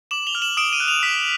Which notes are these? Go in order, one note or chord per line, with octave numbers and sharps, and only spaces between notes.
D6 E7 F#7
F7 G7
F6
E7 F#7
D#6 D7 E7
D#7 F7
F#6
D#7 F7
D#6 B6